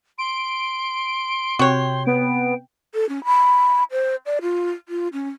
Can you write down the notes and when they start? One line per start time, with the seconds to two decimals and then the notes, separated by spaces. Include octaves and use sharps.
0.18 C6 D7
1.59 C3 F#4 C#5 G5
2.07 B3 D7
2.94 A4
3.09 C#4
3.25 B5
3.91 C5
4.26 D5
4.42 F4
4.89 F4
5.13 C#4